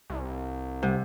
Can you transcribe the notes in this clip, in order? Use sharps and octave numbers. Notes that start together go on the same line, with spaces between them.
C2
C3 G3